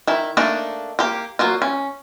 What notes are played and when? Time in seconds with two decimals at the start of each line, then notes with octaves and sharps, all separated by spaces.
0.07 D#3 E4
0.37 A3 A#3 D4 D#4
0.99 A#3 G4
1.39 F#3 A#3 F4
1.62 C#4